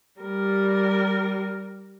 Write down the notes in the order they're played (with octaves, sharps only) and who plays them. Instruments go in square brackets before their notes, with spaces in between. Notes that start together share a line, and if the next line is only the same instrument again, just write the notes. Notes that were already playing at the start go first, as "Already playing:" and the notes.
[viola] G3 A#4